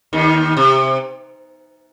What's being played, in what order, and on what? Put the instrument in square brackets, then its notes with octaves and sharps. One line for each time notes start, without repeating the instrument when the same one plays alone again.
[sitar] D#2 D#3
C3